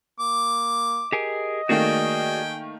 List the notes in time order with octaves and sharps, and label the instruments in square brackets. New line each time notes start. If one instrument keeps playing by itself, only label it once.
[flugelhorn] A#3 [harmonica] D6
[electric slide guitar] G4 G#4 A#4 [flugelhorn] D#5
[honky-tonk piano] D#3 A3 A#3 [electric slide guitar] F#4 G#4 D5 [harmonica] G5 G#5